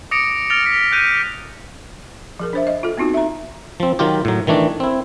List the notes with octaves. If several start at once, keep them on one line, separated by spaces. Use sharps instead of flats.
D6 D#6 A#6 C#7 D7
F6 A6 A#6 D7 F7
B6
F#6 G6 D#7
F3 G#4 A#4
D4 C5 E5
D#5
F4 A4
B3 C4 D#4 F4 F#4
E5 A#5
F3 C4
D#3 F#3 F4 G4
A2 F#3
D#3 E3 A3 D4
C4 E4